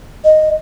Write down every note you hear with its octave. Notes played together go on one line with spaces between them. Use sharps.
D#5